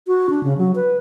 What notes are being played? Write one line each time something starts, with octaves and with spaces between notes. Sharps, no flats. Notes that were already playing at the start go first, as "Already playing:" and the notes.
F#4
D4
C#3
F#3
B4